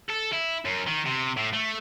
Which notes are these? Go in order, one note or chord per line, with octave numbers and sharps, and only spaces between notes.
A4
E4
F#2
D#3
C3
A2
A3